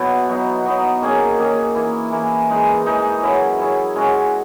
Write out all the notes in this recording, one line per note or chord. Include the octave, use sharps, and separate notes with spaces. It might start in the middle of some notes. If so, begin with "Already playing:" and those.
Already playing: B2 F#3 B3 E4
F#3 B3 D#4
F#3 B3 D#4
D#3 A#3 C#4 G#4
D#3 A#3 C#4 G#4
E3 A#3 E4
E3 A#3 E4
E3 G#3 D#4
E3 G#3 D#4
F#3 C#4 E4 G#4
F#3 C#4 E4 G#4
G#3 C#4 F#4